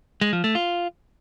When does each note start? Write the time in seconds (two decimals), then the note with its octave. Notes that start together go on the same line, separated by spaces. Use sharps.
0.21 G#3
0.33 F3
0.44 A3
0.55 F4